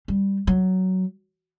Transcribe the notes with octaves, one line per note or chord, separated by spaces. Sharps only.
G3
F#3